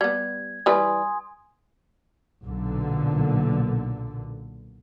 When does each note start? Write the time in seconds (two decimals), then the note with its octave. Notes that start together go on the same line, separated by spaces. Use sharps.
0.01 G3 B3 G#6
0.66 E3 G3 B4 G#5 C6 D#6
2.46 B1 A#2 D3